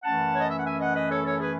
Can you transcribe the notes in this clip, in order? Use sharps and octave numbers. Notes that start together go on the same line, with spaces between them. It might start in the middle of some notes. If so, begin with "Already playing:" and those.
F#2 E3 A3 C#4 F#5 A5
C#5
D#5
E5
F#5
E5 G#5
D#5 F#5
B4 D#5
A4 C#5
A4 C#5
G#4 B4